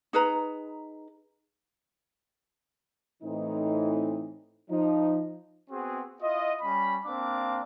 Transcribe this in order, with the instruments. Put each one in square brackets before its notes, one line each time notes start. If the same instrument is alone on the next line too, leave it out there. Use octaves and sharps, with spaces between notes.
[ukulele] D#4 G#4 B4 A#5
[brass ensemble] A2 E3 C4 D#4
F3 D#4
[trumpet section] B3 C4 F#4 G#4
E4 F4 D#5
G3 C#4 B5
A#3 C4 D4 F5 D6